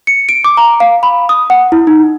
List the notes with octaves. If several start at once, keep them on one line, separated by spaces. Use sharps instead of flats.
C#7
D7
D6
A#5
F5
B5
D#6
F#5
E4
D#4